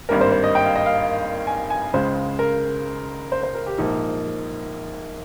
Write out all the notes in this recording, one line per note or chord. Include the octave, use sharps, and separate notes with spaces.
G#1 G2 G3 A#3 A#4
C5
C5
D#5
G5
F5
D#5
F5
G#5
G#5
C#2 C#3 G#3 C5
A#4
C5
C5
A#4
G4
A#1 G#2 F3 A#3 D#4